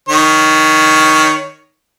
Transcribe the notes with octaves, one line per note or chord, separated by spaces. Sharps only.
D#3 C#5